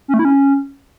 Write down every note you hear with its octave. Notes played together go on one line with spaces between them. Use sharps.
C#4
A3
E4
C#4